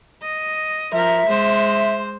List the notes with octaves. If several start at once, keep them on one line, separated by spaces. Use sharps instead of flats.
D#5
F3 A#4 E5
G#3 C5